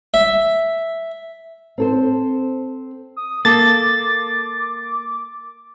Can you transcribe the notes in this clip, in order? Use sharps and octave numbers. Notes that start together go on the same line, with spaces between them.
E5
C4 A4 C5
D#6
A#3 A4 D6 A6